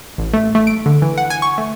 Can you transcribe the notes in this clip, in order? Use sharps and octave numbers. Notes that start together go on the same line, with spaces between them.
A1
A3
A3
D7
D3
E3
F#5
G#5
C#6
A3